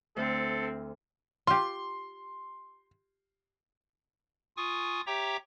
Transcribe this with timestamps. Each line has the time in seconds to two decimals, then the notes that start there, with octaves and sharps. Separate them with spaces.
0.17 D2 C4 A4 C5
1.47 F4 G4 C6
4.57 F4 G#5 C#6 D#6
5.07 G4 C#5 E5 G5 A#5 D6